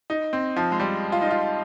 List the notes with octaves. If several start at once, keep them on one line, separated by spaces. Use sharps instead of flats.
D#4
C4
F3
G#3
G3
F4
D#4
F4